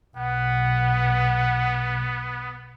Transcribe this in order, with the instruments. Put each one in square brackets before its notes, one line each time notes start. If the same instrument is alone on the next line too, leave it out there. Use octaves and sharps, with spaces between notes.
[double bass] B1 [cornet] B3 [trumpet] F#5